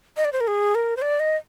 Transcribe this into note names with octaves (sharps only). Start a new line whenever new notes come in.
D#5
D5
C5
A#4
G#4
A#4
C5
D5
D#5